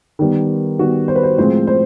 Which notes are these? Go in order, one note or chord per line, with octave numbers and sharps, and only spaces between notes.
D#3 G3 B3
D#3 G3 B3 F#4
C5
B4
C5
A2 F3 G#3 C4 C5
C5